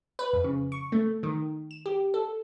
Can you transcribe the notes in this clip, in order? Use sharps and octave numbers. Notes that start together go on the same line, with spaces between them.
B4
F2
C#3
C#6
A3
D#3
E7
G4
A4